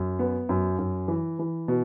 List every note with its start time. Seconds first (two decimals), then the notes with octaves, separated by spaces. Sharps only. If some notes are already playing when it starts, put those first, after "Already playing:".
Already playing: F#2
0.19 B3
0.49 F#2
0.79 F#2
1.08 E3
1.39 E3
1.68 B2